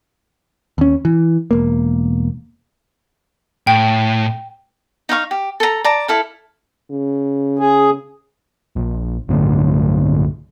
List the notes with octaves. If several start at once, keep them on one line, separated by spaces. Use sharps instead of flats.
D#2 C#4
E3
E1 A#3
A2 G5
D#4 D#5 F5 C#6
G4
A4 A#5
D5 A5 A#5
E4 A4 F5
C#3
G#4
A#1
B1 G2 D3 A3